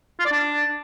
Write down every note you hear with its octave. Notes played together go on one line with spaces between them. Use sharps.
F4
D5
D4